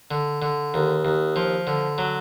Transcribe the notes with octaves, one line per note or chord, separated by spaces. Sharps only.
D3
D3
D#2
D#2
F3
D3
F#3